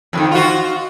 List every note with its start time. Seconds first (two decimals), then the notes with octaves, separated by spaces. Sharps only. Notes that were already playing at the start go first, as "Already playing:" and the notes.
0.13 F2 D3 D#3
0.31 F4 F#4